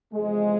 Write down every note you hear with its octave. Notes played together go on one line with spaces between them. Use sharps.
E2 C3 F3 G#3